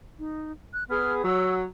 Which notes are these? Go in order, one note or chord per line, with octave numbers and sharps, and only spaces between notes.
D#4
F#6
B3 G#4 F6
F#3 E6